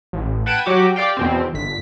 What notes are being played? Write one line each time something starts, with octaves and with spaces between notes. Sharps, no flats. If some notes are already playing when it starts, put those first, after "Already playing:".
A1
B4 F#5 G5 A5 G#6 D#7
F#3 F#4 G4 D6
G4 D5 F5 G5
E2 B2 C4
G1 B6